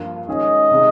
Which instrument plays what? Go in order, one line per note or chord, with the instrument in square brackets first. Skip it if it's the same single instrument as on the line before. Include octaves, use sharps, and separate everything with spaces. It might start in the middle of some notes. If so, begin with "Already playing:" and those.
Already playing: [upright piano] G2 F3 A#3 F4
[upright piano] D#3 G#3 C#4 G#4 [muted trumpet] D#5
[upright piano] C3 D#3 G#3